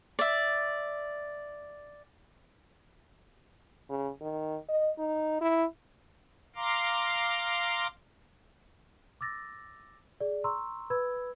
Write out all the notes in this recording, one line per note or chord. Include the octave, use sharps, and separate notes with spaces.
D5 E5
C#3
D#3
D#5
D#4
E4
F5 A#5 C6 D6
D6 E6 A6 A#6
G#4 D5
A#5 C6 C#6 E6
B4 B5 E6 G#6